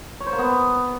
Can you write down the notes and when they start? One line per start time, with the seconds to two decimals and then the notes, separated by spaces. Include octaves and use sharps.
0.20 C#5
0.26 C5
0.32 A#3
0.39 B3